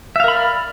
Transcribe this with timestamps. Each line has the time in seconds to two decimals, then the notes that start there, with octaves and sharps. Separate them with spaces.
0.16 E5
0.20 F5
0.24 A#4
0.28 B5
0.32 D5